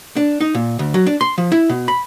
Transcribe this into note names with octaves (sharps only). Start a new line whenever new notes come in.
D4
D#4
A#2
D2
F#3
D4
C6
F3
E4
B2
B5